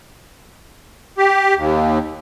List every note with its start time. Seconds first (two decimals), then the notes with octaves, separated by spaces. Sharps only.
1.18 G4
1.56 D#2